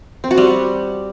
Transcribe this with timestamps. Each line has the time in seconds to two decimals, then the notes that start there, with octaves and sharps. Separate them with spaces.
0.24 C4
0.31 F#4
0.38 G3